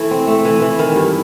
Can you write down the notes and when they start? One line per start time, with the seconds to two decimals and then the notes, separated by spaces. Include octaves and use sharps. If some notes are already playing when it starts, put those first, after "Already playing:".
Already playing: E3 A3
0.11 C4
0.27 A3
0.45 E3
0.62 E3
0.79 D#3
0.96 G2